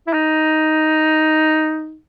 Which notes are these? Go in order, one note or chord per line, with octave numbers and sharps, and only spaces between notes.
E4
D#4